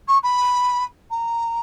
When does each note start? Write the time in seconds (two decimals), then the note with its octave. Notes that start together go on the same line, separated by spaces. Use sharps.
0.08 C#6
0.23 B5
1.11 A#5